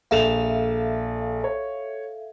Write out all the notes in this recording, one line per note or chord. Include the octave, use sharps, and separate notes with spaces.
A#1 A4 E5 F5 F7
C#5